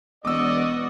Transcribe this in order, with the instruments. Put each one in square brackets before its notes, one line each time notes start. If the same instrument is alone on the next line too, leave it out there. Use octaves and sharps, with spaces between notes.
[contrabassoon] E1 [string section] B3 F#4 [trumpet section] D5 D#5 [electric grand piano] D6 E6